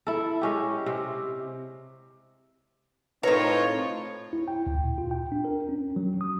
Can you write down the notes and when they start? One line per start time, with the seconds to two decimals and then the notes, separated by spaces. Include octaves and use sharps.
0.07 E4 A4
0.41 G#3 C#4 G4
0.86 C3
3.23 A2 C4 D#4 F4 A#4 B4 C#5 A#5
4.33 E4
4.48 G5
4.67 D2
4.84 A#2
4.98 F4
5.11 G5
5.32 D4
5.45 A#4
5.69 C#4
5.96 F#3
6.21 D#6